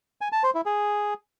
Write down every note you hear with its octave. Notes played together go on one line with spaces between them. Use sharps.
G#5
A5
C5
E4
G#4